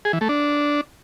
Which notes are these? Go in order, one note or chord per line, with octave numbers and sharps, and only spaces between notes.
G#4
E3
A3
D4